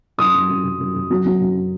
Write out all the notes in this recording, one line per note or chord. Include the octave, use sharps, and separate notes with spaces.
F#2 C6 D#6
F#2
F#2
F#2
F#2
F#2
F#3
F#3
F#2